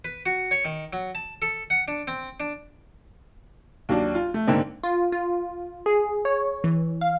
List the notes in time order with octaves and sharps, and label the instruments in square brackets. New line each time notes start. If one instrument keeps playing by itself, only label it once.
[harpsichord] B4
F#4
C#5
D#3
F#3
A5
A4
F#5
D4
C4
D4
[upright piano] D#2 F#3 D4
F4
A3
G#2 D3 A#3 C4
[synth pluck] F4
F4
G#4
C#5
E3
F5